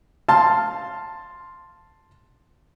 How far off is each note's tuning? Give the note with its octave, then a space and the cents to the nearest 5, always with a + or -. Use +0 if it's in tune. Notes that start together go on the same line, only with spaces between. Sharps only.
F5 +0 A5 +5 C6 +0